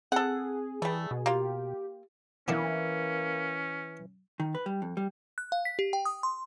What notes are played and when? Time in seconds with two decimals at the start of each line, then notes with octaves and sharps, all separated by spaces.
0.12 C4 G#4 A4 F#5
0.82 E3 G3 A3
1.11 B2
1.26 A#3 F4 G4
2.48 E3 A#3 B3 C#4 D4 E4
4.40 D#3
4.55 B4
4.66 G3
4.82 F2
4.97 G3
5.38 F#6
5.52 F5
5.65 B6
5.79 G4
5.93 G5
6.05 D#6
6.23 C6